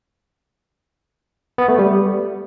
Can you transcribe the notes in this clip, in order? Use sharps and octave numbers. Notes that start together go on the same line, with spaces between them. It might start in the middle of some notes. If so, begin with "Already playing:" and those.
B3
A3
G3